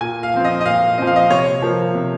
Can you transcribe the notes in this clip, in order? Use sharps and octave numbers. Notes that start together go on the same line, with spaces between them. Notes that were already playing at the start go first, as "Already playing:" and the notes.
A#2 G#5
F5
F3 C4
D#5
D#5
A#2 F5
F3 C4 D#5
F5
D#5
C3 C#5
F3 A#3
C3